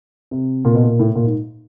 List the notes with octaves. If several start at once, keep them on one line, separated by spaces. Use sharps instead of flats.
C3
A#2
B2
A#2
A2
A#2
G#2